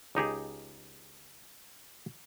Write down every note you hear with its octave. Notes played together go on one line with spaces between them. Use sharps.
C#2 D#4 G4 G#4